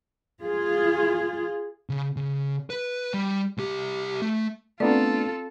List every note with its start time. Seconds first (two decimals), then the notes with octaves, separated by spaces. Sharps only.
0.43 F4 G#4
1.89 C#3
2.17 C#3
2.70 B4
3.14 G3
3.58 C2 G4
4.22 A3
4.80 A3 B3 C4 D4 F4 A4 D5